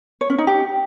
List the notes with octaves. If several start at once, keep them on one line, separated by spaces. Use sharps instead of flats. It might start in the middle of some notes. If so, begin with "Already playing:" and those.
C#5
C#4
D#4
G4